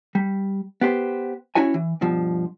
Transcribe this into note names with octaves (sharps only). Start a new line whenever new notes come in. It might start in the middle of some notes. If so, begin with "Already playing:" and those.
G3
B3 G4 C5
C#4 E4 F#4 C#5 G#5
E3
G2 B2 F3